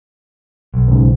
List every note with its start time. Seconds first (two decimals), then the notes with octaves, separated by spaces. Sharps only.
0.74 B1
0.88 C#2 G#2